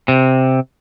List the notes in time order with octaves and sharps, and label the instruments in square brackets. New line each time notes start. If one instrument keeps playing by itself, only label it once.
[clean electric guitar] C3